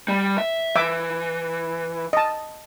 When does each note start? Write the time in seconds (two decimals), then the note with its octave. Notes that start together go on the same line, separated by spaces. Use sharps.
0.08 G3
0.38 E5
0.76 E3 E5 D6
2.13 D#5 A5